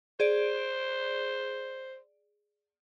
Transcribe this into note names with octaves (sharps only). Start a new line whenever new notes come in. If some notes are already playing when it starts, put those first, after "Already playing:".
G#4 C5 D5 D7